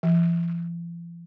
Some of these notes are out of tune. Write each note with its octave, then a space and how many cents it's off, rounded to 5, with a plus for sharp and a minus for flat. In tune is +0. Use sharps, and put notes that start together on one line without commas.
F3 -45